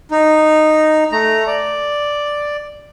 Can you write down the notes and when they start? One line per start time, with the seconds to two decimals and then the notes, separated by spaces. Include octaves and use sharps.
0.11 D#4
1.12 A3 A#5
1.47 D5